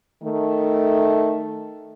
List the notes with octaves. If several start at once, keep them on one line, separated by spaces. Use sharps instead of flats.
D#3 A3